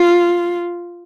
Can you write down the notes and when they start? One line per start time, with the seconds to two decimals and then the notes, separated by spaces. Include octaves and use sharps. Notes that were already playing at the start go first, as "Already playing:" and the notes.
Already playing: F4